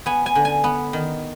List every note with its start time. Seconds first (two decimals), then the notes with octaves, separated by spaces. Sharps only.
0.06 B3 G#5
0.26 G#5
0.35 D3
0.45 G#5
0.64 B3
0.93 D#3